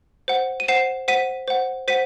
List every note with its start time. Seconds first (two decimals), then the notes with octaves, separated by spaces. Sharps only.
0.28 C5 F#5
0.60 D#7
0.68 C5 F#5 C7 E7
1.08 C5 F#5 B6 D#7
1.48 C5 F#5
1.88 C5 F#5 B6 D#7